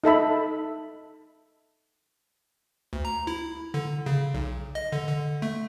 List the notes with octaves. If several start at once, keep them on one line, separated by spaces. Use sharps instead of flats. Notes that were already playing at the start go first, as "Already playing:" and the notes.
D#4 A4 E5 B5
D2
A#5
E4
D3
C#3
B1
D#5
D3
D3
A3